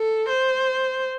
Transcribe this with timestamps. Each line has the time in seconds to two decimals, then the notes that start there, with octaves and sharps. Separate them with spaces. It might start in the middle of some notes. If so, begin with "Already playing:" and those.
Already playing: A4
0.29 C5